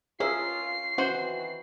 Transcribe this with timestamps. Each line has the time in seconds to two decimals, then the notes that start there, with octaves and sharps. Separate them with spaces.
0.20 C#4 F4 G#4 A#4 E5 C7
0.98 D#3 E3 C#4 F#4 C5 C6